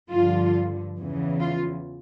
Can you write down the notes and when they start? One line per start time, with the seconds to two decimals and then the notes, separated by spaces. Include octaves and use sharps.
0.11 G2 D3 F3 F4
0.97 E2 C#3 E3
1.40 F4